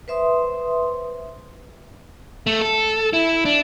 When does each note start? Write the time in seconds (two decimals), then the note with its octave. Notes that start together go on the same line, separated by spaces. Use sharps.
0.08 B4 C5 E5 C6 D#6
2.47 A3
2.62 A4
3.13 E4
3.45 D4